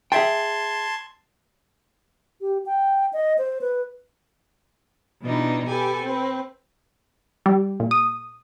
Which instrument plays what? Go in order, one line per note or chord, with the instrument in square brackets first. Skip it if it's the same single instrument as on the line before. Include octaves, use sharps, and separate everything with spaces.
[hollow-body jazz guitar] G#4 E5 G5 [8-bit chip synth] A5 C6 G#6
[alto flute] G4
G5
D#5
C5
B4
[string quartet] B2 E3 G3 D4 D#4
G4 A4 B4 G#5
C4 B4
[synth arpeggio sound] G3
A#2
D#6